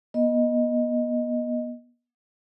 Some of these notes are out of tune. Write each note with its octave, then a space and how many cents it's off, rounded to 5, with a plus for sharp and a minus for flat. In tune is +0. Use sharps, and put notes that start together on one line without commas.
B3 -35 D#5 +0